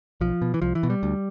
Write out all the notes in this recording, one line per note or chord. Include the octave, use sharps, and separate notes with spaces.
B1 F3
B2
E3
C2 F3
E3
B2
G3
D2